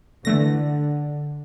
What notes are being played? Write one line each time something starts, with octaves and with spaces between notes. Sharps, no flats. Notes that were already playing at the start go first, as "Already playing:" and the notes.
D3 E3 A3 A#6